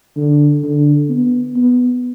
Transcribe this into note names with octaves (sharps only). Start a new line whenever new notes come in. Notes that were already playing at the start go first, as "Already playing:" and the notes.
D3
D3
B3
B3